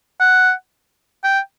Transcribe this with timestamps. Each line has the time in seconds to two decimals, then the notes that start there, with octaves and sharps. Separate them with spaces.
0.20 F#5
1.24 G5